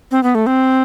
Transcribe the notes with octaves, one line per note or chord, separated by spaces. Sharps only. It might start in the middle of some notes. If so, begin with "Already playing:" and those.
C4
B3
A3
C4